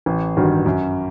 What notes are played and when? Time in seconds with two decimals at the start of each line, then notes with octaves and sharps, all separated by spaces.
0.06 A1
0.37 G2 D#3 F#3
0.66 F#2